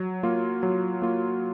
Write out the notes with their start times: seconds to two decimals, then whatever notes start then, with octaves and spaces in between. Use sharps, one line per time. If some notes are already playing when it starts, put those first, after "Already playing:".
Already playing: F#3
0.23 A#3 F4
0.63 F#3
1.02 A#3 F4